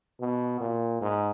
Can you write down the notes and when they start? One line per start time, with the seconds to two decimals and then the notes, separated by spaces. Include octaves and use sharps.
0.21 B2
0.60 A#2
1.01 G#2